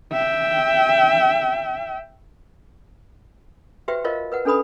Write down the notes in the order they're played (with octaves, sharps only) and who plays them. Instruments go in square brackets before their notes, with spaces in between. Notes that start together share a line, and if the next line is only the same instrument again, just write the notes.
[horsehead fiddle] E5 G5
[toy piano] F#4 G4 B4 C5 E5 G5
F4 A#4 C5 D#5 F5
A#4 B4 F#5
C#4 D4 A4 B4 B5 D#6